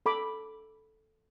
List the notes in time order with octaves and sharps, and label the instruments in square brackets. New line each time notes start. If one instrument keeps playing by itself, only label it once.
[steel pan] A4 B5 D6